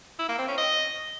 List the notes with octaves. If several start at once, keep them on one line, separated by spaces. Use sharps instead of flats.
E4
A#3
C4
C#4
D#5